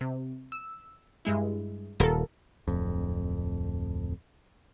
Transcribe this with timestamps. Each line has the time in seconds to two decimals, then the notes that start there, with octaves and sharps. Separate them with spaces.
0.01 C3
0.52 E6
1.25 G2 G#3 E4
2.00 D#1 A4 A#4
2.68 D1 F2